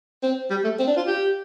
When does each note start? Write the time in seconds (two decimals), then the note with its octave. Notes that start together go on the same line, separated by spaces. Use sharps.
0.23 C4
0.50 G3
0.64 A3
0.79 C4
0.87 D4
0.97 F4
1.07 G4